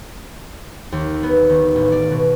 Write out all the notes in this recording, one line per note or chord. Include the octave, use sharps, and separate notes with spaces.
D#2
B3
D#3
A1
D5
B2